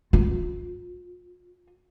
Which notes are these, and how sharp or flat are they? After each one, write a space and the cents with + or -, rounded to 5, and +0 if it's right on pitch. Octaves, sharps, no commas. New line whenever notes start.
F4 +35